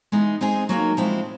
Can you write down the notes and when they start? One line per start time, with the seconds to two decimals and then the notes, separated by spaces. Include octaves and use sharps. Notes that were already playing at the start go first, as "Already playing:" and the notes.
0.12 E3 G#3 B3 D#4
0.41 G#3 C4 D#4 G#4
0.69 F#3 A#3 D#4
0.97 F3 G#3 C4 E4